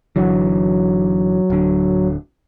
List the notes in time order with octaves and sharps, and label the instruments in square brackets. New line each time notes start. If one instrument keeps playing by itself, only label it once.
[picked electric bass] G1 D3 E3 [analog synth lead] F#3
[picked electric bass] D1 D3